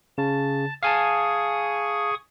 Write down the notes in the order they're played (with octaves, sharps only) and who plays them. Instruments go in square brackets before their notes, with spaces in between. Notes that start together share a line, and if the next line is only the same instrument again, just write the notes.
[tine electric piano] C#3 [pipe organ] A5
[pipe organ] G#4 C#6 D#6 [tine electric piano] F5 G#5 A5